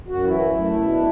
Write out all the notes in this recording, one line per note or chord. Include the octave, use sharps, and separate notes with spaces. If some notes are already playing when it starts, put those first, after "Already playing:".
F#2 F#4
E3 E4
F#2
A3
B2
D4